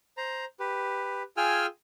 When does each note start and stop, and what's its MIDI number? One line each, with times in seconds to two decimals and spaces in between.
0.17 0.45 72
0.17 0.45 82
0.60 1.23 67
0.60 1.23 71
1.37 1.66 65
1.37 1.66 68
1.37 1.66 79
1.37 1.66 80
1.37 1.66 88
1.37 1.66 89